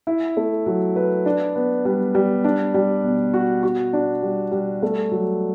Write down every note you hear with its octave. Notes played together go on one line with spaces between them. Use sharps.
E4
A3
F#3
B4
D4
B3
G3
G3
D4
G3
B2
F#4
F#4
D4
G3
G3
A3
F#3